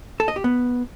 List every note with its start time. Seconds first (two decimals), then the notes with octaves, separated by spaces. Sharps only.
0.20 A4
0.28 D#5
0.36 G4
0.44 B3